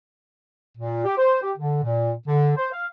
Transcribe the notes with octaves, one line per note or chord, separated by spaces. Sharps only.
A#2
G4
C5
G4
D3
A#2
D3
C5
F5